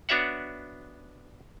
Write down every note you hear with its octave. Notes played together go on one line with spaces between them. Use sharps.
B3 D4 F#4 C#5 E5 F#5